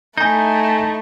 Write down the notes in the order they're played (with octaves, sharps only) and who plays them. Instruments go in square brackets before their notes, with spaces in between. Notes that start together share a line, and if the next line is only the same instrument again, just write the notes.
[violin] A3 [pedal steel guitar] D#4 E4 [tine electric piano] G#5 G6